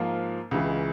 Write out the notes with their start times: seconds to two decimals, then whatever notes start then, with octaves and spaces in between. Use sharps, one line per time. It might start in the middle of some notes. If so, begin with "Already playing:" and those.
Already playing: G#2 F3 A#3 F4
0.51 C#2 C#3 E3 G#3